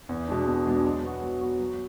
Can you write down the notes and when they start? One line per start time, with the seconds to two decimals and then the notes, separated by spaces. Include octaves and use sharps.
0.09 E2
0.28 B2 G#3 D4
0.47 E2
0.66 B2 G#3 D4
0.85 F#3
1.03 B3 F#4
1.22 F#3
1.41 B3 F#4
1.60 F#3